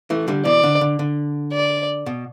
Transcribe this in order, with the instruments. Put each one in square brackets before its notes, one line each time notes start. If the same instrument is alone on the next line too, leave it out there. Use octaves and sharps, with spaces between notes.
[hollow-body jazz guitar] E3 A3
D3 G3
[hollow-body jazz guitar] B2 E3 [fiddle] D5
[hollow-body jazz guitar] D3
D3
D3
[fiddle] D5
[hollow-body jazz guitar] B2